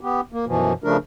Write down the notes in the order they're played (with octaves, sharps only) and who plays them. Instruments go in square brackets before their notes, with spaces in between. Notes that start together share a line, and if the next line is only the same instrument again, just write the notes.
[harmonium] B3 G4
A#3
F#2 B2 E3 F3
C#3 F3 A3 D4 A#4